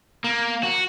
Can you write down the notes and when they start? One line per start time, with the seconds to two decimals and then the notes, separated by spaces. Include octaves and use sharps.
0.24 A#3
0.63 F#4